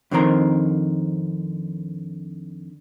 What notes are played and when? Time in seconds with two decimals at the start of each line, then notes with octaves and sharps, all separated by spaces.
0.11 F2 D3 D#3 C4 A#4 A#5